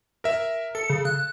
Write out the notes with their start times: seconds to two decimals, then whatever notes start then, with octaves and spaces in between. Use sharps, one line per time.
0.24 A#4 E5
0.75 A4 C#7
0.90 C#3
1.05 F#6